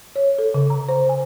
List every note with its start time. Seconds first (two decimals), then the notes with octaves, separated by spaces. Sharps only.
0.16 C#5
0.39 A4
0.54 C#3
0.70 A#5
0.89 C5
1.09 G#5